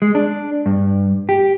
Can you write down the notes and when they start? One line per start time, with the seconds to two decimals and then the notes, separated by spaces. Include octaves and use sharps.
0.02 G#3
0.15 D4
0.66 G2
1.29 G4